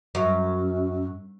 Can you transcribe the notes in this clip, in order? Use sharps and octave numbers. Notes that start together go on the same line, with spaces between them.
F#2